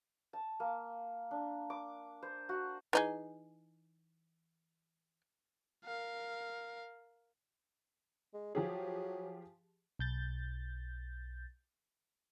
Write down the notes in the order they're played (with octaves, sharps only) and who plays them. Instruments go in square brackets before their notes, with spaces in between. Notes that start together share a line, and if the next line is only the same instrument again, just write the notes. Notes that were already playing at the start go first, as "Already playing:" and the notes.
[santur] A5
A#3
D4
D6
C5
F#4
[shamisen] E3 D#4 G#4
[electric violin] A#4 F5
[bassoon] G#3
[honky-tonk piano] F3 G4 G#4 [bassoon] F#3
[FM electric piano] B1 G6 A6